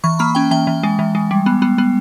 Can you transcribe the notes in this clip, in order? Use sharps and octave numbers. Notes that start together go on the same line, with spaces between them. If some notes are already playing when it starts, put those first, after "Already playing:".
E3 C#6
A#3 B5
C#4 G5
E3 G5
E3
G#3
E3
G#3
G3
B3
B3
B3